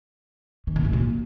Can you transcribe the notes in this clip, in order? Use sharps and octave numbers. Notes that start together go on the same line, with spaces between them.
D#3
A#2
G#2
A#2